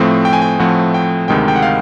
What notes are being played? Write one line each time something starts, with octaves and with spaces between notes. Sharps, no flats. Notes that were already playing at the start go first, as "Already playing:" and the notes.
Already playing: A2 F3 A3 C4
G5
G#5
G5
A2 F3 A3 C4 F#5
G5
D2 C3 D#3 G#3 G5
G5
F#5
F5